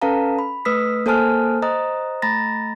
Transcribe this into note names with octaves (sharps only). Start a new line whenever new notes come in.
C#4 A4 B4 F5 A5 A#5
B5
A3 B4 D#6 E6 B6
A#3 A4 C5 G#5 A5 F6
C5 D#5 A#5 D#6
A3 A#5 B5 A6 A#6